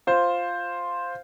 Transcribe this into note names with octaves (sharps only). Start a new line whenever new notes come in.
F4 C5